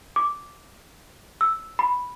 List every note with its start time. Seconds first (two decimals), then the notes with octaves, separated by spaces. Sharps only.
0.16 D6
1.41 E6
1.79 B5